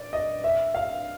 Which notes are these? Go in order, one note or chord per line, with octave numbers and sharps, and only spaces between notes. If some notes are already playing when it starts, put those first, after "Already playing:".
Already playing: D5
D#5
E5
F5